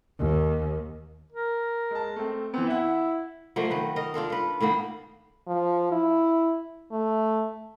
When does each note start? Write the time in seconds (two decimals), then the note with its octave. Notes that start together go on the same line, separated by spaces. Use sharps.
0.20 D#2
1.32 A#4
1.91 G#3 A5
2.16 A3 C4
2.54 E3 B3 C4
2.66 E4 E5 F#5
3.56 F3 F#3 A3 A#3
3.71 D#3 B4
3.96 A#4 D#5
4.14 D4 F4 A4 A#4
4.30 F4 B4
4.60 A2 D#3 A#3 B3
5.47 F3
5.91 E4
6.92 A3